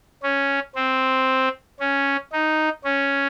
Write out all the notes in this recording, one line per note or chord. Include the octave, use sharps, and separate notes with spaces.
C#4
C4
C#4
D#4
C#4